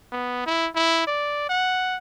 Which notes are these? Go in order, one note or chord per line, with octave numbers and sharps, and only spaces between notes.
B3
E4
E4
D5
F#5